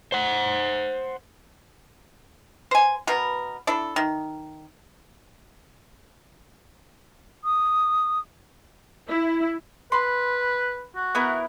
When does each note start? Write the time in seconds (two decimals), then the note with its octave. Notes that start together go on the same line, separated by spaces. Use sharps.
0.12 C5 F#5
2.71 C5 G#5
3.07 B2 B3 A#4
3.67 D4 E4 A4
3.96 D#3
7.44 D#6
9.08 E4
9.92 B4 B5 C6
10.95 F#4
11.15 B3 E4 A#4